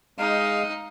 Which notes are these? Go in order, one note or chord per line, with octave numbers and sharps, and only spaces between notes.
G#3 D#4 F5